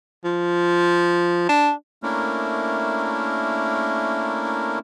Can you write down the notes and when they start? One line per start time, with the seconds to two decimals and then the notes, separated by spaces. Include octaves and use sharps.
0.24 F3
1.49 D4
2.03 A3 A#3 C#4 D4 E4 A#4